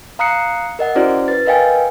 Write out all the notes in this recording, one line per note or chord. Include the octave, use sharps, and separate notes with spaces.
F5 A#5 D#6 F#6 C7 C#7
A#4 D#5 F#5
C#4 E4 F#4 C5 D5
B4 A6
A#4 B4 D#5 F5 G5 G#5